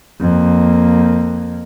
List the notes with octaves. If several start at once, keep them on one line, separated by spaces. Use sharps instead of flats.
F2 A#3